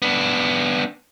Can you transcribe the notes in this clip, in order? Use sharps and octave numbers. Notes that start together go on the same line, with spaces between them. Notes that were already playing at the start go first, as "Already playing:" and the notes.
B3 D4